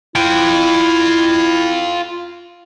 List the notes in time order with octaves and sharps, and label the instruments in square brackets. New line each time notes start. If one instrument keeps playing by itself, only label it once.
[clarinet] E4 [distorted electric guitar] F4 G5